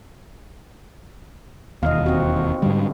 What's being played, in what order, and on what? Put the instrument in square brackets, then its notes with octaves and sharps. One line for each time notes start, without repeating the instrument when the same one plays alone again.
[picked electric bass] E1 D#2 [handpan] D#5 F5
[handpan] C4 F#4
[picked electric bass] G#2 G3 [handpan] D3